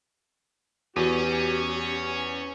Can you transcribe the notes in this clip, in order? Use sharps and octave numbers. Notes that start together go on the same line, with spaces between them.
E2 C#4 F#4 G4